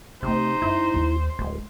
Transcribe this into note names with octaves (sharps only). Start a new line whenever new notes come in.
C3 G#3 A3 D#4 C5
F#2 E4
D#2
D1 G#3